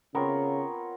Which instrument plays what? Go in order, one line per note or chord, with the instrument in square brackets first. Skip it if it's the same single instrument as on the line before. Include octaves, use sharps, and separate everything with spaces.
[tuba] C#3 [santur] B3 C4 C#5 [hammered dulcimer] F4 A#4